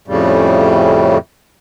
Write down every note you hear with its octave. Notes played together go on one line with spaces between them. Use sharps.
F2 A2 C#3 G3